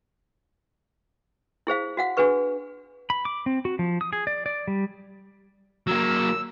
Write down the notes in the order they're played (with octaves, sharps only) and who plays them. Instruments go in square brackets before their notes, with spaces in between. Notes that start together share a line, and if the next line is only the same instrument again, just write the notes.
[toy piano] E4 G#4 C5 F5
F#4 F5 F#5
D4 F#4 G#4 B4 C#6
[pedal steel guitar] B5
D6
C4
F#4
F3
D#6
G#4
D5
D5
G3
[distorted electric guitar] F#3 A#3 [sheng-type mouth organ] E6